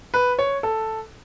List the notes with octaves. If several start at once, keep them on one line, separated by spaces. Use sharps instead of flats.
B4
C#5
A4